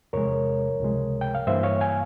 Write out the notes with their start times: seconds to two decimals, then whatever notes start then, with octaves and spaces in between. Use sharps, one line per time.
0.13 E2 C3 F3 G#3 A#4 C#5
0.80 C#2 C3 F3 G#3
1.21 G5
1.35 F5
1.47 G2 E3 A#3 C5 E5
1.63 C#5 F5
1.81 F5 G#5